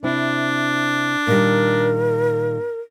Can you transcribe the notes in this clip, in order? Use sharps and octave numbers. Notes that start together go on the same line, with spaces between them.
C3 C4 D4 E4
A#2 D#3 G3 A#4